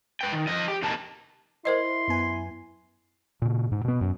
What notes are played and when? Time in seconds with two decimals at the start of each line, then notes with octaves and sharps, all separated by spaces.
0.21 B4 G5
0.32 D#3
0.47 F3 D#5
0.68 G4
0.82 F2 C3 A#3 D#4 A5
1.65 E4 A#4 C5 D#5 C6
2.08 F#2 B3 G#5
3.42 A#2 C#3
3.71 G#2
3.84 B2 B3
4.01 F#2